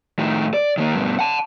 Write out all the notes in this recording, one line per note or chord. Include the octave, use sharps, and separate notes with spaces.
A2 D#3
D5
D#3 A#3
G2 B2
F#5 A5